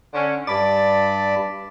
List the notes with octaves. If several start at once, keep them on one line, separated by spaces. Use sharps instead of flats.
D3 C#4
G2 D5 A5 B5